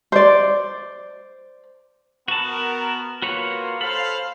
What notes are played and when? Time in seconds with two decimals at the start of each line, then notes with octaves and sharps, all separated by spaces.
0.12 C5 D5
2.28 B3 F#4 A#4 A5
3.22 A#3 F4 F#4 B4 C#5
3.81 A4 C5 F5 B5